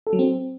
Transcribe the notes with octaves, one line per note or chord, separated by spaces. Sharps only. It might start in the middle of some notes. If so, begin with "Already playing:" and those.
A4
F#3
C4